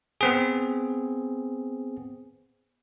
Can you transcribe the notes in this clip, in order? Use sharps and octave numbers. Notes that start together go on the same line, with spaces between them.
B3 C4 G#4